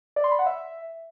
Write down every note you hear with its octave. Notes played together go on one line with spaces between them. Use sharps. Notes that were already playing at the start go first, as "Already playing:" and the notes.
D5
C6
B5
F#5
E5